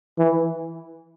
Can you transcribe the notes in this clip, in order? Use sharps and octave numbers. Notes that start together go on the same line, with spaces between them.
E3